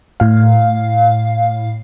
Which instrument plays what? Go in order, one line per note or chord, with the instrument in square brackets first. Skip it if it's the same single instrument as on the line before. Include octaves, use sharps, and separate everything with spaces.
[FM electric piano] A2 F5